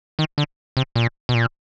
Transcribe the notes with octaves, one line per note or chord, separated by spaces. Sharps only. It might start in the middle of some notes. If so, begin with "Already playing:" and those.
D#3
D3
C3
A#2
B2
A#2